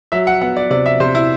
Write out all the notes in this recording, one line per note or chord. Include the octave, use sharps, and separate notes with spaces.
F#3 E5
F#5
B3 F#5
D5
C3 D5
E5
C3 C5
E4